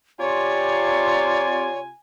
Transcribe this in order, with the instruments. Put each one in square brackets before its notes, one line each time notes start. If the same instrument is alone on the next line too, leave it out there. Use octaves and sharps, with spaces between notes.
[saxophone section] C3 F4 [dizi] C#5 [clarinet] D5 [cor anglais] G#5